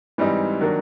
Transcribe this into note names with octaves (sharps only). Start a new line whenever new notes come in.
G#2 E3 G3 C4 D#4
D#3 F#3 A#3 D4